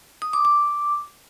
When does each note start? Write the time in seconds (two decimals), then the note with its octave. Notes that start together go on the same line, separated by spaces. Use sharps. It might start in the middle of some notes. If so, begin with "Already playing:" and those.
0.22 D#6
0.33 D6
0.45 D6